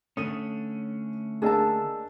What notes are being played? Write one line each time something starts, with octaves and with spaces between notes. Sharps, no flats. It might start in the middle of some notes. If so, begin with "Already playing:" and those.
D3 A3 C#4 D#6 D#7
A#3 D4 G#4 D#5 A5 E6